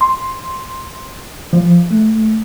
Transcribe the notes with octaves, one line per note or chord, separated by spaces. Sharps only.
C6
F3
A3